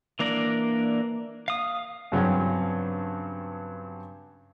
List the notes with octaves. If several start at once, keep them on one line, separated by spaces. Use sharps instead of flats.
E3 A#3 D4 A#4 D5
F5 D#6
G2 C#3 F#3 C4 C#4